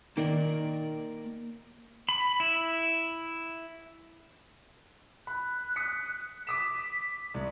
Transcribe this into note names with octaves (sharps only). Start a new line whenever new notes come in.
D#3 A#3 A#4 D5
B5
E4
B5 F#6
D#6 B6 C#7
D6 D#6 B6 E7
C2